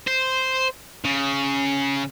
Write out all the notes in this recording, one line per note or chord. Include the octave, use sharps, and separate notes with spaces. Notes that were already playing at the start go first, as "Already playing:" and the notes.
C5
C#3